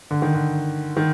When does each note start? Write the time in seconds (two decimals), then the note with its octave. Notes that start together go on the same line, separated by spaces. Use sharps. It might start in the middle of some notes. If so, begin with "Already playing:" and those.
0.11 D3
0.22 D#3
0.34 D3
0.96 D#3